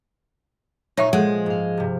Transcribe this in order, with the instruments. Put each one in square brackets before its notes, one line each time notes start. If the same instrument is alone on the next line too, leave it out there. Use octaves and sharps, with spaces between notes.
[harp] A#2 G#5 [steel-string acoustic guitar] D#4 [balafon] C#5 E5 C#6
[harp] F3 G#4 [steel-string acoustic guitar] G#3 [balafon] A4 F#5
[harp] G#2 F5
G2 C3